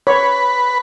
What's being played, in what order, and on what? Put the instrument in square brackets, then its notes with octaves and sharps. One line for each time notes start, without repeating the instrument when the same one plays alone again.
[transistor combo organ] B4 [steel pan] C#5